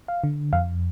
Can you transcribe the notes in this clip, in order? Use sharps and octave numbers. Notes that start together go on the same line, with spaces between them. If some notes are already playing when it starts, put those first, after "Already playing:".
F5
D3
F2 F5